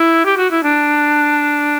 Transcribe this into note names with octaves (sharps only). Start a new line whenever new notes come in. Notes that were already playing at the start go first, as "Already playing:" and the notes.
Already playing: E4
G4
F#4
E4
D4